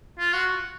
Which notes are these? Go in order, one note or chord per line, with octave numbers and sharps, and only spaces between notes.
F4
F#4